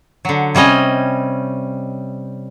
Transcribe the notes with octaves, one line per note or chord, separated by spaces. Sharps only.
D3 F#3
C3 G3 C#4 D#5 G#5